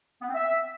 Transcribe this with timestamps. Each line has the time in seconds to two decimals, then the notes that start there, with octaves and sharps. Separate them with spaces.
0.22 B3
0.28 C4
0.35 E5